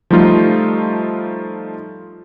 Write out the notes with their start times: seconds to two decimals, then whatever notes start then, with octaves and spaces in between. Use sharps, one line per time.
0.11 F3 G3 A3 D#4 F4